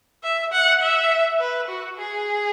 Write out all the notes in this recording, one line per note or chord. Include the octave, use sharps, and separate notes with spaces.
E5
F#5
E5
B4
F#4
G#4